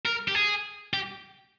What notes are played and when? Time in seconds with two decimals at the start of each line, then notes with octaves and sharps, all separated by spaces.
0.05 A#4
0.28 G4
0.35 G#4
0.94 G4